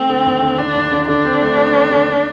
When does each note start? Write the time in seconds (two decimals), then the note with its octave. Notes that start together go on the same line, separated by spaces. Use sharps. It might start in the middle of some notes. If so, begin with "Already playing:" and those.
Already playing: A3 C4
0.10 D3
0.26 D#2
0.42 D3
0.59 D3 D4
0.75 D#2
0.92 D3
1.08 D3 D4
1.25 C4
1.42 A3
1.58 D3
1.74 C4
1.91 D3
2.07 A#3